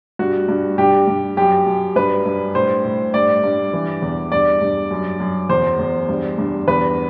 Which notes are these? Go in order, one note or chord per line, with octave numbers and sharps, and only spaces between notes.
G2 F#4
G2
G2 G4
G2
F#2 G4
F#2
G2 B4
G2
A2 C5
A2
G2 D5
G2
E3
E2
G2 D5
G2
F#2
F#2
E2 C5
E2
G2
G2
E2 B4